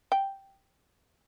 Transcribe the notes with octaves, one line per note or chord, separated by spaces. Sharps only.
G5